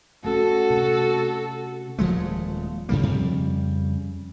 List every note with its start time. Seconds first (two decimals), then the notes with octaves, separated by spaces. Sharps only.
0.25 A3 C#4 F#4 A4
0.70 C3 A3
1.99 D#1 F3 G#3 A3
2.89 G#2 D3 G3 A#3
3.03 F2 C#3 G3